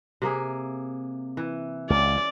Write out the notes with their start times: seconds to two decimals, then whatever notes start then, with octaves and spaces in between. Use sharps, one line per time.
0.22 C3 A#3 G#4
1.37 E3
1.90 C#2 C#4 D5